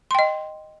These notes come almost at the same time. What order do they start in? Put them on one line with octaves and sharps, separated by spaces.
C6 G5 D#5